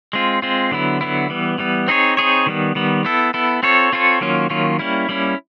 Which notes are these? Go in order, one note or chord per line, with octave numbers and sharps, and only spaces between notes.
G#3 C4 F4
G#3 C4 F4
D3 F#3 B3 E4
D3 F#3 B3 E4
E3 G3 B3
E3 G3 B3
C4 D#4 G#4 C#5
C4 D#4 G#4 C#5
D#3 G3 B3
D#3 G3 B3
B3 E4 A4
B3 E4 A4
C4 F4 A4 C#5
C4 F4 A4 C#5
D#3 F#3 A#3 C#4 F4
D#3 F#3 A#3 C#4 F4
G3 A#3 C#4 E4
G3 A#3 C#4 E4